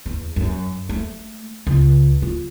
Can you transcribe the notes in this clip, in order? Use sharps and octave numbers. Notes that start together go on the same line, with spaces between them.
E2
F#2
A3
C#2
F4